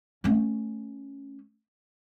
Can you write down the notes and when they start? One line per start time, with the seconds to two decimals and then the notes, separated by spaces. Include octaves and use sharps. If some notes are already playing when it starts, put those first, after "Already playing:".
0.24 A3 C#4